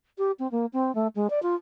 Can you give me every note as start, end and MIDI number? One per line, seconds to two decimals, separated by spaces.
0.18 0.32 67
0.39 0.50 60
0.51 0.66 58
0.73 0.94 60
0.95 1.07 57
1.15 1.30 56
1.30 1.42 74
1.43 1.55 65